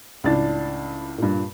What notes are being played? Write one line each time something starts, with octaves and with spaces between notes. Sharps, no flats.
C#2 A2 D4 A6
G2 A#2